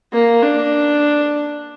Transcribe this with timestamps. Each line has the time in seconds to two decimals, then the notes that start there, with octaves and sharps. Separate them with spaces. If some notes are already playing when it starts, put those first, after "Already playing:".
0.13 A#3
0.43 D4